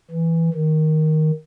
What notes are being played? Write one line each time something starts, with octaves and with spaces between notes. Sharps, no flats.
E3
D#3